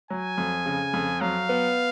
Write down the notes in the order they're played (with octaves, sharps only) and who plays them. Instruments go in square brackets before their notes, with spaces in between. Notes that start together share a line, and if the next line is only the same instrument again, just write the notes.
[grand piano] F#3 [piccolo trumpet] G#5
[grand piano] F2
C#3
F2
[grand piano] F#3 [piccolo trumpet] F5
[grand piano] B3